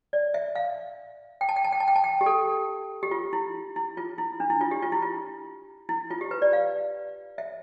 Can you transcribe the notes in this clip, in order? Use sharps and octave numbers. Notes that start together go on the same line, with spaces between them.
D5
E5
F5
G5
A5
G5
A5
G5
A5
G5
A5
G5
G4
A4
G4
F4
E4
E4
F4
E4
D4
E4
F4
G4
F4
E4
F4
E4
F4
G4
B4
D5
F5
E5